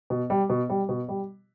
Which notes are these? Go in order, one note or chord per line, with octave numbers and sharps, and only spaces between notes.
B2
G3
B2
G3
B2
G3